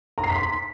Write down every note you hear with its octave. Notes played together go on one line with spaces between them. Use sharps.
A#5
C7
B6
C6